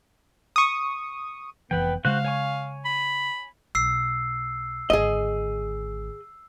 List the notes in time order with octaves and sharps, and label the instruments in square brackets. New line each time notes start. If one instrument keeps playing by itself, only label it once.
[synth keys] C#6 D#6
[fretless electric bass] F1 C2 E3 [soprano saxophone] B3 [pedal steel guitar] B4 G5
[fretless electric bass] C#3 G#3 [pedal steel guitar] F#4 C5 F#6 [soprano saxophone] F5
[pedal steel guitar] C#5 G#5 C#6
[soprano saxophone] B5
[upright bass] B1 [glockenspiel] E6 C7
[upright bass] G#1 D3 [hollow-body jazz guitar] G#4 D#5